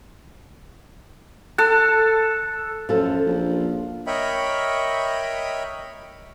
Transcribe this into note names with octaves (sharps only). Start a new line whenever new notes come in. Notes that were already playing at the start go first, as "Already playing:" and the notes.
A4 F#6
F#2 F3 A4
A#1
A#4 C#5 D#5 E5 G5 B5